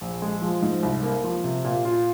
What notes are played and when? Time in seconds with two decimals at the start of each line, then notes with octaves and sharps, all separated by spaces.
0.01 A#1
0.22 G#3
0.42 F3
0.62 G#2
0.83 C2
1.03 A#3
1.24 F3
1.44 C3
1.64 A#2
1.85 F4